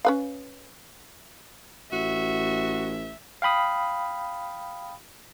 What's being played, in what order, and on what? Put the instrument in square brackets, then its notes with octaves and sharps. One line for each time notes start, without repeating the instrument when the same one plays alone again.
[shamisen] C#4 B4 F5
[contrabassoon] A1 [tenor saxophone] F#4 [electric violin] E5
[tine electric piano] F5 G5 B5 D#6